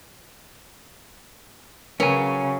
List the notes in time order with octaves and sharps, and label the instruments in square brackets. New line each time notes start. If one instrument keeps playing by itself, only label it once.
[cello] C#3 [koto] F#3 [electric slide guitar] C#4 G#5 [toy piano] A#4 B4